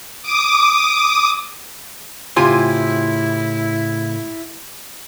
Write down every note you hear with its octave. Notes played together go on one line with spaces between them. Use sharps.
D6 D#6
A2 C#3 C4 E4 F4 G4 G#5